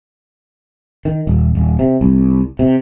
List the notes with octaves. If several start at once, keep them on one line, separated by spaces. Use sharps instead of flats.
D#3
D#1
D#1
C3
C2
C3